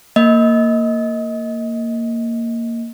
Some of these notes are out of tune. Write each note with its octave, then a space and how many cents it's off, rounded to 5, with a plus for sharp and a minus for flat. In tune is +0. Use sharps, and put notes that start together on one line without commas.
A#3 -10 D#5 +20